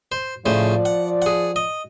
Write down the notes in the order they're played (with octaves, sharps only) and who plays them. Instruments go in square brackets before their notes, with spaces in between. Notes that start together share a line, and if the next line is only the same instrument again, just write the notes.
[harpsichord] C5
[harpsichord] A2 C#3 C5 [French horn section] F3 D5
[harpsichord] F#5
G#4 F#5
D#5